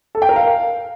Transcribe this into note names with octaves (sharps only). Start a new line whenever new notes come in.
A4
G5
A#4
F5